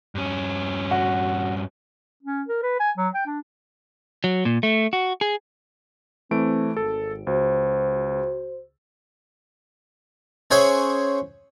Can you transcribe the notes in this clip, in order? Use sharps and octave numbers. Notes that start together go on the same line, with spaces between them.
G2 C#4
F#4
C#4
A#4
B4
G#5
F#3
G5
D4
F#3
A#2
A3
F#4
G#4
E3 A3 C4 C5 D7
G#1 A4
C#2 F#4 C5
C#4 G#4 C5 E5 F#5 G#5